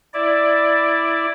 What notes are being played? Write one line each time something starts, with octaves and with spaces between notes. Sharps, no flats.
E4 D5